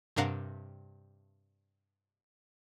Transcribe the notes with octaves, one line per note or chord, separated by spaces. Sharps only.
G2 C3 D4 A#4 F5 F#5